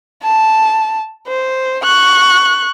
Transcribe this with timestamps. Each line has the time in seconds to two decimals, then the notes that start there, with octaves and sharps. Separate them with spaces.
0.23 A5
1.27 C5
1.84 C#6 F#6